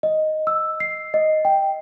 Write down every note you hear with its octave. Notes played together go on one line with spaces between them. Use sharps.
D#5
E6
C7
D#5
G5